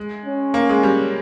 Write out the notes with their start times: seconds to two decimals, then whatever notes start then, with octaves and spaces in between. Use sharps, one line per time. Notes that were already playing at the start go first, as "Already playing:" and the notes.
Already playing: G#3
0.26 C#4
0.54 A#3
0.69 G#3
0.83 G3